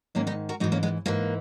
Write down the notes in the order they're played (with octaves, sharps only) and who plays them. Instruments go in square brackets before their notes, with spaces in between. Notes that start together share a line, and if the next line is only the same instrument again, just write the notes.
[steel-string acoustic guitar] G#2 D#3 A#3 C#4
B3 D#4
F#4 A#4
G#2 E3 D#4 F#4
A#3 C#4
G#3 B3
G#2 E3 A#3